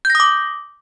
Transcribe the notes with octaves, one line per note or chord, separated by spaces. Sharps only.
D6 D#6 G6 A#6